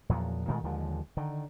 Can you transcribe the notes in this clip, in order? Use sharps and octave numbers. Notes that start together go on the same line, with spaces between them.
E2 A#2 F3 F#3
A#2 D#3 G#3 A3
D#2 D3 F3 G#3
D3 D#3